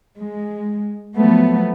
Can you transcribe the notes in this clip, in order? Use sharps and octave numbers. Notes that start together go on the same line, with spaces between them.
G#3
F3 F#3 A3 B3